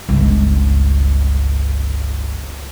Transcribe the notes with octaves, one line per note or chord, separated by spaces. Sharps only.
G1 C#2